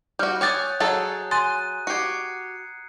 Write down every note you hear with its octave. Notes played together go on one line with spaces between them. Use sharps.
G3 F#4 F6 G6
C#5 G5 G#5 D6 D#6 F#6 G6 A6
F#3 G#4 A4 A#5 A6
G#5 C6 D#6 F#6 A6 D#7
F#4 G4 G#6 C7 C#7